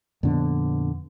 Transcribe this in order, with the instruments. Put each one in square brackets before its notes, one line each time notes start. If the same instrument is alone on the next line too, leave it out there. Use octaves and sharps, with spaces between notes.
[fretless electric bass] F2 A#2 D3 B3